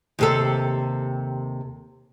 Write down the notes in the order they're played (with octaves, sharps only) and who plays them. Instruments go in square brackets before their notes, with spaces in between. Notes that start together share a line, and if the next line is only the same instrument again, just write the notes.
[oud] D#2 C3 A4